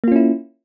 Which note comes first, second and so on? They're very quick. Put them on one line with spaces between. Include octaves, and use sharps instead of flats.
A#3 F4 C#4 E4